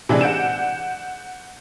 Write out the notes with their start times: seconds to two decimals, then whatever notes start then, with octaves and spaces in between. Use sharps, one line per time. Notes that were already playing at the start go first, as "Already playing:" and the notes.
0.09 C3 E3 G#3 D4 G#5
0.21 F#5 G6 D7 E7